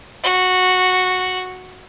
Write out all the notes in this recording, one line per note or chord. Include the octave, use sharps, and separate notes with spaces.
F#4